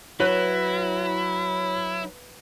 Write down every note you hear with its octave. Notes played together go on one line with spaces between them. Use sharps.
F#3 E4 B4 C#5